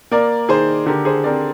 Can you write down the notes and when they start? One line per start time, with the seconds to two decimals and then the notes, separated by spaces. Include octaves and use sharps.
0.11 A#3 A#4 D5
0.49 D#3 G#4 C5
0.86 D3 G4 A#4
1.05 G#4 C5
1.24 C4 A#4 D5